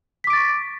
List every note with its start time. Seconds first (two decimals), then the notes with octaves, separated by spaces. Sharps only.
0.24 B6
0.27 D6
0.30 D7
0.33 A6
0.36 C#6